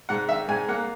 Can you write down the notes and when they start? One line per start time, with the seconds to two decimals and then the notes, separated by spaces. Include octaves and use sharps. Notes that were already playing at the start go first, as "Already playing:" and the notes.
0.09 G#2 F#5
0.29 D#3 E5
0.48 G#2 G#5
0.68 A#3 F#5